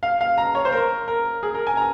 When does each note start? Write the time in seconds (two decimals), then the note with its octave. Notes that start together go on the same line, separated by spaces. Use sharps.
0.03 F5
0.21 F5
0.38 A#5
0.55 C#5
0.65 C5
0.72 A#4
1.08 A#4
1.43 G#4
1.54 A#4
1.67 G#5
1.77 A#5